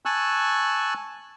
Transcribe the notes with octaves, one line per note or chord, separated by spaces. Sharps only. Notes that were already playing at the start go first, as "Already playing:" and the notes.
G#5 A5 C#6 E6 F#6